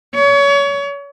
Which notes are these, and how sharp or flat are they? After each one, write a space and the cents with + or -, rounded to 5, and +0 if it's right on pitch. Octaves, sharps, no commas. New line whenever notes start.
C#5 +30